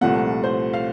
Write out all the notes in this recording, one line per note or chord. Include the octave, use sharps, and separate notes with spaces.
C2 A#2 F3 A3 F#5
C5
F5